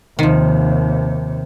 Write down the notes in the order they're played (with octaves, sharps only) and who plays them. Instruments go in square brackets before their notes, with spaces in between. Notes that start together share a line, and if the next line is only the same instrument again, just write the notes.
[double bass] D#2 C3 [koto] D#3 F3